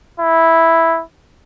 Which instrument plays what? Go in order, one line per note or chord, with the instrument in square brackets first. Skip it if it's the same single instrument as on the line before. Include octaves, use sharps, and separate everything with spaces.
[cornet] E4